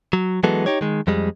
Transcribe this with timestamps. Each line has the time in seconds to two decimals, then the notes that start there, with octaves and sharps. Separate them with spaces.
0.13 F#3
0.43 E3 F#3 G#3 B3 A4
0.66 D#4 G4 C#5
0.81 D#3 G#3
1.07 F2 G3 G#3